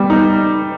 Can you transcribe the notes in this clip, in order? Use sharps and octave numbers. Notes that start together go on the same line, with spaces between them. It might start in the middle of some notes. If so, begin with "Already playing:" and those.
Already playing: G3 B3
D#4